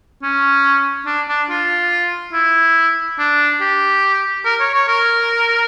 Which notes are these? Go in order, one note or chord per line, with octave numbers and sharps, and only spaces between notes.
C#4
D4
D4
F4
E4
D4
G4
A#4
C#5
C#5
A#4